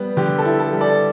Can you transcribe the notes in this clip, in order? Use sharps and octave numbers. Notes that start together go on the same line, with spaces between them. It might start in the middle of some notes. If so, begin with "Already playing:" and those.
Already playing: G3 B3
D3 G4
A4
E4
A4
G3
A4 D5